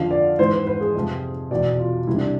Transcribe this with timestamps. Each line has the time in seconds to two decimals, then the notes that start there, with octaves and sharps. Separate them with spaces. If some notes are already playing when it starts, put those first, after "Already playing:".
Already playing: F2 D3 F3 F5
0.11 D5
0.39 G#2 E3 C5
0.53 B4
0.67 B4
0.81 G#4
0.95 F2 C3 F3
1.51 E2 B2 D5
1.79 F4
2.07 C2 C3 E3 E4
2.16 D4